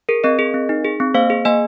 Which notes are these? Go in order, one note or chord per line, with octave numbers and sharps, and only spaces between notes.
G#4 A#4
C4 A#4 D#5
G#4
C4
D#4
G#4
C4
A#3 C5 F5
G#4
A#3 D#5 G#5